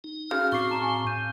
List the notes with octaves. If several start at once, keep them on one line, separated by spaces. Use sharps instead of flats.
D#4
C#3 F#4 F6
A2 C4 F#4 C#6 D6 C7
A5 A#5 E7
F5 G#5
G6 D#7